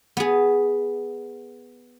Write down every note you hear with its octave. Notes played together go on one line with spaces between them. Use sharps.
B3 G#4